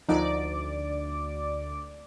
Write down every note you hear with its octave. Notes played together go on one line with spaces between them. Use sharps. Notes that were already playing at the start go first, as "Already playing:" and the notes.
D2 F3 D#4 D5 D6